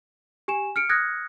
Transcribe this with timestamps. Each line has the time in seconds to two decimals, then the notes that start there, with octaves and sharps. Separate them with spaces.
0.48 G4 G#5 E7
0.76 F6 C#7 D7
0.89 D#6 F6 F#6 G#6 A#6 C#7